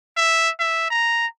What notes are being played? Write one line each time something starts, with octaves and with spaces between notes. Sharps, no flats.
E5
E5
A#5